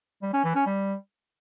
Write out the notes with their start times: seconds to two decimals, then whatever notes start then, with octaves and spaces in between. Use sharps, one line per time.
0.22 G3
0.33 C#4
0.44 E3
0.55 C#4
0.66 G3